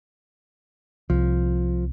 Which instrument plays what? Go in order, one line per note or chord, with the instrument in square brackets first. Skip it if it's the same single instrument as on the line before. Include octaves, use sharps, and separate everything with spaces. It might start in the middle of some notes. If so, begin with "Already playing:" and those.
[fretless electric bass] C2 [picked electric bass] F3